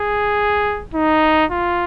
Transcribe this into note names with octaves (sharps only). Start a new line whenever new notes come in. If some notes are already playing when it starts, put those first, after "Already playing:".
Already playing: G#4
D#4
F4